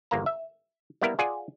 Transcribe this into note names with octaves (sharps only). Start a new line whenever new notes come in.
G1 E2 A#3 F5 A#5
E5
G3 A#3 B3 E4 A#4
F4 G#4 D5 F#5 G#5